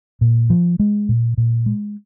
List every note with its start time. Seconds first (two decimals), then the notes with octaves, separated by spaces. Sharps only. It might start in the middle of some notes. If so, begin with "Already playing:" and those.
0.21 A#2
0.50 F3
0.79 G#3
1.09 A#2
1.37 A#2
1.66 G#3